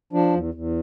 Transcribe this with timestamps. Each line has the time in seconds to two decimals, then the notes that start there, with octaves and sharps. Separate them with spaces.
0.13 F3 D4
0.34 E2
0.54 E2